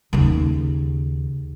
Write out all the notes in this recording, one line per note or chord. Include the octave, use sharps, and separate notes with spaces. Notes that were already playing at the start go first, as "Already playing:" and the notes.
D#2 C#3